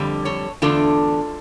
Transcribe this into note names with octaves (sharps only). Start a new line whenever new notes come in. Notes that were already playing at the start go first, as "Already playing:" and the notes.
Already playing: F2 D3 G3
A4 C#5
E2 D3 A3 D4 F4 A4